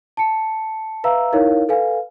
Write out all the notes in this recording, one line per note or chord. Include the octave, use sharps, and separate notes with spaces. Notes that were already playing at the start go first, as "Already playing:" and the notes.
A5 C#7
B4 E5 F5 A#5 E6
D#4 E4 A#4 C#5 F5
A4 B4 F5 G#5